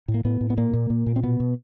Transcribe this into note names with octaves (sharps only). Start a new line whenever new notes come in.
A2
A#3
A2 B3
A2
B3
A#2 A#3
A#2
A#2
A#2
C4
B2 B3
B2